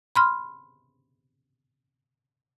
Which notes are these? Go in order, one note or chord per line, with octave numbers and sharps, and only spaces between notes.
B5 C6 F6